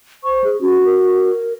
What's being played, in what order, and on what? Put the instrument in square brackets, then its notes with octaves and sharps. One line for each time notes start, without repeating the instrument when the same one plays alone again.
[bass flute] C5 [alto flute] C#6
[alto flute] G#4
[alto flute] C#4 [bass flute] F#4
[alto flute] A#4